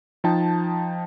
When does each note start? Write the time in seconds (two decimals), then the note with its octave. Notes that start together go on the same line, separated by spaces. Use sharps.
0.24 F3 D#4 G5 A5